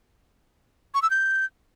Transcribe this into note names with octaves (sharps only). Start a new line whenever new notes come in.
C#6
E6
G6